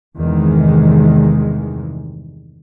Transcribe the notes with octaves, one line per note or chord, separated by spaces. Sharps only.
E2 G2 C3 D#3 E3 G#3